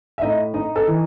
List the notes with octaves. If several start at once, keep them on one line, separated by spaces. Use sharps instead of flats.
E5
A2 D#4 D#5
D#4 D#5
A4 A5
E3